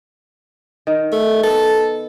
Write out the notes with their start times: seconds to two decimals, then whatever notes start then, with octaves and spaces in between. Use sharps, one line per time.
0.87 D#3
1.12 A3
1.43 B3 A4